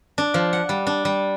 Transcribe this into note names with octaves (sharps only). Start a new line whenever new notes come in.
D4
F3
F#5
G3
D4
G3